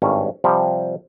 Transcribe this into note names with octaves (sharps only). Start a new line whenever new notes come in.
G#1 G2 C#4
C3 F3 G3